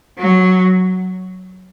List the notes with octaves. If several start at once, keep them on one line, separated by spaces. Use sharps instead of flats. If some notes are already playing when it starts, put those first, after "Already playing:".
F#3